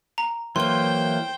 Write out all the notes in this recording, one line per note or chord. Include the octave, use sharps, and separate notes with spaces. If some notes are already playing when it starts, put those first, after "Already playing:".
A#5
E3 F#3 A#3 C5 G5 C6 G7